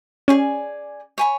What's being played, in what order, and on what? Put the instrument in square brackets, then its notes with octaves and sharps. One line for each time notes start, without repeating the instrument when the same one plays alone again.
[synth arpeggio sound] C#4 [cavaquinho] G#4 D5 G#5
[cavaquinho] C#5 G#5 B5